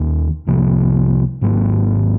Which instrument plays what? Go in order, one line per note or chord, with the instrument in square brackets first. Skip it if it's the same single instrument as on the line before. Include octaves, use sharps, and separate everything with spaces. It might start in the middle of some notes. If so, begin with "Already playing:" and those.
Already playing: [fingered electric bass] D#2 D#3 A#3 C#4
C2 C3 F3 A#3
G#1 G#2 F#3 A#3